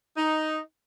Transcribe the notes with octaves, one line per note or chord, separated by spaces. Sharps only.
D#4